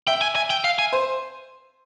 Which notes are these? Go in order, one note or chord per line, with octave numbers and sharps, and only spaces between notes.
E5 G5
G#5
G#5
G5
F5
G#5
C5